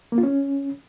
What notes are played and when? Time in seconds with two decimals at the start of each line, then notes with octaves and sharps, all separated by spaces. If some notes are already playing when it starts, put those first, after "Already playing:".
0.12 A#3
0.18 F4
0.23 C#4